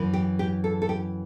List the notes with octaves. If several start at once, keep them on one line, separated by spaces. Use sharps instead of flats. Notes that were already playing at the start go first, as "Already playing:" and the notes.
Already playing: F#2 E3
G4
G4
A4
A4
G4